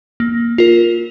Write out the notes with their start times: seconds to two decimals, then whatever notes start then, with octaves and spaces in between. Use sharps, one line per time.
0.20 A#3
0.58 F4 A#4